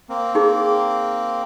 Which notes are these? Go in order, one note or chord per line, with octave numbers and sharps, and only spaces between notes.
A#3 C4
D#4 G#4